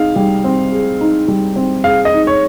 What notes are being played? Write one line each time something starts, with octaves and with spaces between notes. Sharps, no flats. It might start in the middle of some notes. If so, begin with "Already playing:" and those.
Already playing: C4 D#4 G#4 F5
G3
C4
G#4
D#4
G3
C4
G#4 F5
D#5
D#4
C#5